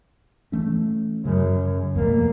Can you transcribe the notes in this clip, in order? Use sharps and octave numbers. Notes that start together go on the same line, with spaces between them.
E3 A3 C#4
F#2 C#3
E2 B2 F3 A3 A#3